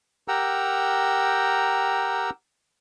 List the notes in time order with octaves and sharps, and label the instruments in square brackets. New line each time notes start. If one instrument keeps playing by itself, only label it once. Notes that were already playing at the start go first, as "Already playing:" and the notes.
[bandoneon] G4 A#4 F#5 G5 A#5 E6